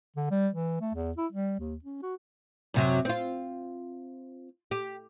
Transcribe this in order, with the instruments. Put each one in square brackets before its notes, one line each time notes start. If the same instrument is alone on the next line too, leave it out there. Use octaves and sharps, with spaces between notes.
[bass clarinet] D3
G3
E3
A3
E2
E4
G3
D#2
C#4
F#4
[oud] F#2 C3 F#3
C4 F4
G4